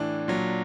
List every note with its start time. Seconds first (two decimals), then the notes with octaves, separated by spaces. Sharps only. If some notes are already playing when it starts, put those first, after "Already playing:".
Already playing: A2 E3 D4
0.28 A#2 F#3